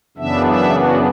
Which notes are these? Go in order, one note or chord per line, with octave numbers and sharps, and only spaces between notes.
F#2 C#3 E3 B3 D4 E5
E5
F#4